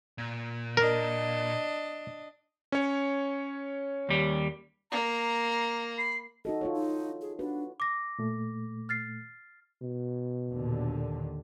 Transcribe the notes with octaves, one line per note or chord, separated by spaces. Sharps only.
A#2
D4 A#4 D#5
C#4 C#5
D#2 G3
A#3 A#5
B5 C7
D#4 F#4 A4 D#5
F4 A4 C#5
D#4
G#4
D4 F#4 B4
D6 A#6
A#2 A3
F6 A6 C7
B2
D#2 A#2 D3